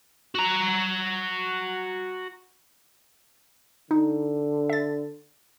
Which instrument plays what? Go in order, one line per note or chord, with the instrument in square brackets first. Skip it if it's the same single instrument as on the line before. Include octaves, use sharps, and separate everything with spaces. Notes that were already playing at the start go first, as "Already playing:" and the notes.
[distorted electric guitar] F#4 A#5
[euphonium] D3 [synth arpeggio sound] D#4
[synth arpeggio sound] E5 A6